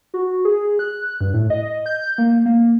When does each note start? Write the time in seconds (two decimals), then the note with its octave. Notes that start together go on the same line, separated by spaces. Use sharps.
0.14 F#4
0.45 G#4
0.79 F#6
1.21 G2
1.34 A2
1.50 D#5
1.86 G6
2.01 G6
2.18 A#3
2.46 A#3